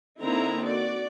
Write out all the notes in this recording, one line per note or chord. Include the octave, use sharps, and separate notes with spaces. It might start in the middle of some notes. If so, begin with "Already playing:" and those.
D3 A#3 C4 D#4 E4 A#5
F#4 D5